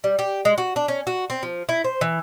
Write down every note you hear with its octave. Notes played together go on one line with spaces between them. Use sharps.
G3
G4
G#3
F#4
D4
C#4
F#4
C4
F3
E4
C5
E3